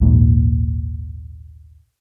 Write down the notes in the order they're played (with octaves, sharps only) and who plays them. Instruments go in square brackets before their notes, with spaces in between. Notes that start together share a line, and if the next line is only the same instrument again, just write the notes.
[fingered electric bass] D#1 A#1 D#2 G#2